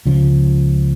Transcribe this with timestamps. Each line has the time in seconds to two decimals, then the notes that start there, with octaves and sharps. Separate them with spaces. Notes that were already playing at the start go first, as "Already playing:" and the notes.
0.06 C#2 C#3 F3